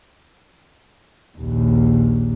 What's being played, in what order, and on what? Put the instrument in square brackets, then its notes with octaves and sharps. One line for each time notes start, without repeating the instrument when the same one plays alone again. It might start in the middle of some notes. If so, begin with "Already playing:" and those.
[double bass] A#1 D#2